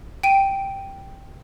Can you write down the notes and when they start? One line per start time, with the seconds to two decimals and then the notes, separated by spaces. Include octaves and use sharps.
0.23 G5 D7 D#7